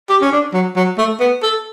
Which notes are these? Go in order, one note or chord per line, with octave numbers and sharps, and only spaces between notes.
G4
C#4
D4
F#3
F#3
A3
B3
A4